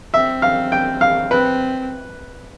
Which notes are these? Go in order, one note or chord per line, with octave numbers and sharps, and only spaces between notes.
C4 E5
F5
G5
F5
C4 B4